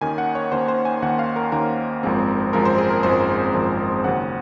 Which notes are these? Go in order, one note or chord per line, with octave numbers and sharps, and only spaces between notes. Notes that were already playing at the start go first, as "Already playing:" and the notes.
D#2 D#3 A#3 C#4 G#5
F#5
C#5
D#2 D#3 A#3 C#4 C5
C5
G#5
D#2 D#3 A#3 C#4 F#5
F5
A#4
D#2 D#3 A#3 C#4 A#4
G#1 F#2 F3 G#3 C4
G#1 F#2 F3 G#3 C4 A#4
C5
G#4
A#4
G#1 F#2 F3 G#3 C4 C5
G#1 F#2 F3 G#3 C4
D#2 C#3 F#3 C#4 F#5